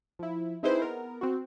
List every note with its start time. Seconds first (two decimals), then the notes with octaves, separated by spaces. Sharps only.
0.19 F3 E4
0.63 C4 D#4 E4 G#4 B4 C5
0.82 B3 A#4
1.21 C4 F#4